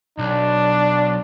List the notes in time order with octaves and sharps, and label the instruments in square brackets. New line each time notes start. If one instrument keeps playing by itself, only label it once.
[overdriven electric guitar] B1 [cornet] D4